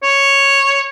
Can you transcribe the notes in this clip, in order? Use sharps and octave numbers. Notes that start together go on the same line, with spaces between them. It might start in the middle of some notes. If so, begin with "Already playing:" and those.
C#5